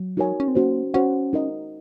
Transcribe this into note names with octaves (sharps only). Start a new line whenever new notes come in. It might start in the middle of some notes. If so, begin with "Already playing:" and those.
Already playing: F#3
D#4 F#4 A#4 C#5 G#5
C#4
C4
A#3 C#4 F#4 C5
C#4 F#4 C5 F#5
D#4 A#4 D#5